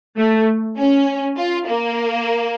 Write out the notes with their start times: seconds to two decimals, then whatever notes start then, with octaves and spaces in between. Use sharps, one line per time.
0.17 A3
0.77 C#4
1.37 F4
1.67 A#3